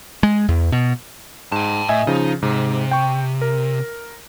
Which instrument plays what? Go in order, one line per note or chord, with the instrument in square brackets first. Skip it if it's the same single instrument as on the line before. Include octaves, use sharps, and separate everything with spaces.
[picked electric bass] G#3
E2
B2
[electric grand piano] G#2 [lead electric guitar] G5 A5
[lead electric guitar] A2 [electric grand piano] D#5 E5 G#5
[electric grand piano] C#3 F3 [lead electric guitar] D#4
[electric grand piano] G#2 [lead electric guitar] C3
[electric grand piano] G5 C#6
A#4